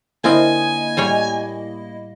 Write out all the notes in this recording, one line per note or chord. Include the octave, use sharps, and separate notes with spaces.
D3 A#3 C4 E4 F4 D#5 G#5
A2 G3 C#5